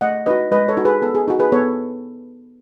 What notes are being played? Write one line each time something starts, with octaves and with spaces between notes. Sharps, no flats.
A3 D#5 F#5
D#4 F#4 B4 D#5
G#3 B4 D#5
A4 C#5
D#4 F#4
G#4 B4
B3 A4
G#4
D#4 F#4
G#4 B4
B3 A4 C#5